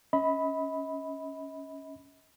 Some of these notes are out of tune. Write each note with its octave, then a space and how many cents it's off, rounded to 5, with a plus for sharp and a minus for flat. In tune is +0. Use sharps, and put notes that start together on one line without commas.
C#4 +5 D#5 +40 B5 +0